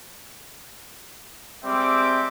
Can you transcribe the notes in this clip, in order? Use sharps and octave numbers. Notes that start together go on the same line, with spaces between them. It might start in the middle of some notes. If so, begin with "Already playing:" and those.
G3 G#3 C4 E5 G5 D6